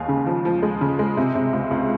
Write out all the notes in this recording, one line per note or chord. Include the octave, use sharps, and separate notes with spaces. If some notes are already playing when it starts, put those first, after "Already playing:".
Already playing: D#2 G#3 F5 G#5
C#3
F3
F3
G#3
C#3
G#3
C3
C3
C#2
C#2